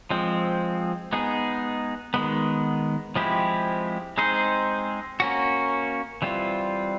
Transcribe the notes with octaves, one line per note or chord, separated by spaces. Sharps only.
F3 G#3 C4
G#3 B3 D#4 G#4
D#3 G#3 B3
F3 G#3 C4 E4 G4
G#3 C4 D#4 G#4 C5
A#3 C#4 F#4
E3 G3 C4 F4